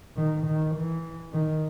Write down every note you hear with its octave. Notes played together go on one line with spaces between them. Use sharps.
D#3
D#3
E3
D#3